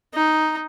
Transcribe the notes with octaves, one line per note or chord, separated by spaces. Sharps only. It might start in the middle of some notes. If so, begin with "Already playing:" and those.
D#4